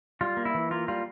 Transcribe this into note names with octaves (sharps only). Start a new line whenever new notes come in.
G3 F4
A#3
E4
E3
A#3 F4
G3 F4